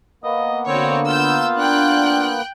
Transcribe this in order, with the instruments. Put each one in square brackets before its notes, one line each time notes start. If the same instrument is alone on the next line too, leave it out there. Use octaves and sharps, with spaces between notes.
[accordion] A#3 B3 [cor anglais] D#5
[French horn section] D3 [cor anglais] C4 [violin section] F#4 C#5
[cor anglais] F4 [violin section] E6 G6
[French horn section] D4 [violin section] G5 F#6